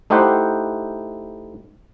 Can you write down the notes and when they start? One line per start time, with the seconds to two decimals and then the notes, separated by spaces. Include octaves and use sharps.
0.10 A3 D#4 E4 G4 C5 F#5